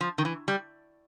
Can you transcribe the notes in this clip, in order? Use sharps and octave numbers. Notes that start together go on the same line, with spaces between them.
F3
D#3
E3
G3